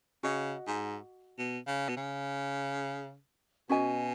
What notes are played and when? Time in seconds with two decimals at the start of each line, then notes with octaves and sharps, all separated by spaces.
0.23 C#3 F#4 D#5 F#5
0.67 G#2
1.38 B2
1.67 C#3
1.89 B2
1.96 C#3
3.69 B2 C#4 F#4 D#5 G#5